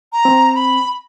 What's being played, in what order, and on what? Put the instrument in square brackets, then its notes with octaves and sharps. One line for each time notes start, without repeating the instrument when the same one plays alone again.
[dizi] A#5
[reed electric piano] C4
[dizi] B5